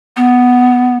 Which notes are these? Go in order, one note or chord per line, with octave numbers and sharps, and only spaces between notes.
B3